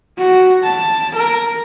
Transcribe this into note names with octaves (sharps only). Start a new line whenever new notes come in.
F#4
A5
A#4